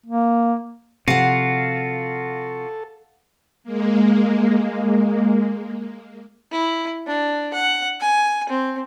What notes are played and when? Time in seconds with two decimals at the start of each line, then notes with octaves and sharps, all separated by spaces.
0.06 A#3
1.08 C3 F3 F4 F#4 A4 F5 F#5
3.64 G#3 A#3
6.52 E4
7.07 D4
7.54 F#5
8.00 G#5
8.49 C4